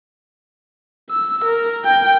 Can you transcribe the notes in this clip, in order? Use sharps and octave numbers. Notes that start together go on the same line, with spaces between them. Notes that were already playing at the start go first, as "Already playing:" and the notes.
E6
A#4
G5